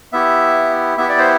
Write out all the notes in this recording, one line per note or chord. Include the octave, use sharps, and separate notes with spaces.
B3 E4 G4 E5
B3 E4 G4 E5
D5
C5